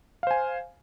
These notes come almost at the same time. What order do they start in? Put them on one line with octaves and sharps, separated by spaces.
F5 C5 G#5